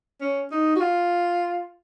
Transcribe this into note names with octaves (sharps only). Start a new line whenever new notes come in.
C#4
D#4
F#4
F4